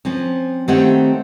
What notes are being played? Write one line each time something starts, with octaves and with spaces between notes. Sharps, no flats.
F3 C4 C#4
D#3 A3 C4 G4 C#5 F#5